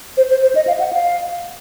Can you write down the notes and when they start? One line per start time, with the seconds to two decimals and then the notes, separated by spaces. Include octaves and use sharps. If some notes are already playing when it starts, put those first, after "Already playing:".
0.17 C5
0.30 C5
0.42 C5
0.55 D#5
0.67 F5
0.80 F#5
0.93 F5